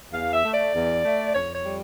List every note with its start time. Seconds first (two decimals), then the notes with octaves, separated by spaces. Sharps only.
0.12 E2 F5
0.33 E5
0.43 A3
0.53 D5
0.74 E2
1.04 A3
1.35 F2 C#5
1.55 C#5
1.65 G3